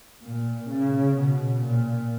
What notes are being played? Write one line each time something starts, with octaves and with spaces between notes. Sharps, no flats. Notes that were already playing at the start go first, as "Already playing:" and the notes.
A#2
C#3
B2
A#2